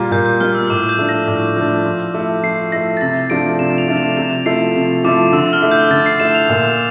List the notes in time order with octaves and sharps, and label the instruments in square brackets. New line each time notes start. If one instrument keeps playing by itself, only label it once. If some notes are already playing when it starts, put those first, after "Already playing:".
Already playing: [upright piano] A#2 G3 A#3 F4
[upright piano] A#2 [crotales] G6
[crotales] G6
[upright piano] G3 A#3 F4 [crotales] F6
[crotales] E6
[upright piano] A2 [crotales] D6
[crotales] G6
[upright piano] F3 A3 D4
[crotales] A#6
[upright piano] A2
F3 A3 D4
F3
A3
E4
[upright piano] F3 [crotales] C7
[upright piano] A3 E4 [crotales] A#6
[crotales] A6
[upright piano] C3 [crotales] A#6
[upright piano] F3 A3 D4 F4 [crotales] D7
[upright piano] C3 [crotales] E7
[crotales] F7
[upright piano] F3 A3 D4 F4
[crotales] F7
[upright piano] C3 [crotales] E7
[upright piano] F3 A3 E4 [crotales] C7
[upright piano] C3
[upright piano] F3 A3 E4 [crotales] D6
[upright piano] D3 [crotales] E6
[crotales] F6
[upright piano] A3 E4
[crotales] G6
[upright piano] D3 [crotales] A6
[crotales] C7
[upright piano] A3 E4 [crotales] E7
[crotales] F7
[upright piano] A#2